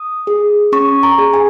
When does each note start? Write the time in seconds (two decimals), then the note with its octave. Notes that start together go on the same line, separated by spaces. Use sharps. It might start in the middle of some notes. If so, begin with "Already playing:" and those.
Already playing: D#6
0.27 G#4
0.72 C#4 C#6
1.03 A#5
1.18 G#4
1.34 G#5